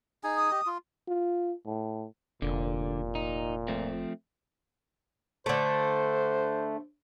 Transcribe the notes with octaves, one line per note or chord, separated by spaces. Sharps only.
D#4 G#4 G#5
D#6
G4 D#5
F4
F4
A2
F1 A#2 D3
D#4
F3 A3 C4
D3 A3 C5